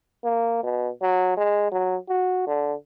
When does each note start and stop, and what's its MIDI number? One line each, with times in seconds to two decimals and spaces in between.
0.24 0.62 58
0.63 0.89 47
1.02 1.36 54
1.37 1.69 56
1.72 1.96 54
2.09 2.43 66
2.47 2.74 50